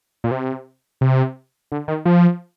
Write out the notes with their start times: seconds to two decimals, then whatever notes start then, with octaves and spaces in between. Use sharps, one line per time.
0.24 A#2
0.31 C3
1.01 C3
1.72 D3
1.88 D#3
2.05 F3